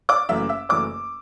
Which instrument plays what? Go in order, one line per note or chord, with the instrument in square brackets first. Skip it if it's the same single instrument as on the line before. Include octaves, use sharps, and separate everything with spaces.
[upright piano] D5 D6
F#1 F#2 E3 A3 E5 E6
E5 E6
F#1 F#2 E3 A3 D5 D6